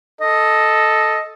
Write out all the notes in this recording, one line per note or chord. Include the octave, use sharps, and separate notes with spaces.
A4 D#5